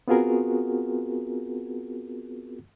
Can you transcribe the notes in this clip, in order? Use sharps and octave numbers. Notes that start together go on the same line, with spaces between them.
B3 C4 F4 F#4 G#4 A#4